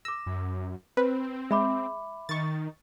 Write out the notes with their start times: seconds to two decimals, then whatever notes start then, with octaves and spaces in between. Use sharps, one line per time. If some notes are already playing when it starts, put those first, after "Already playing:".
0.05 D6 E6 A#6
0.26 F#2
0.97 C4 B4 C5
1.51 G#3 E5 B5 D6
2.29 D#3 C#6 A6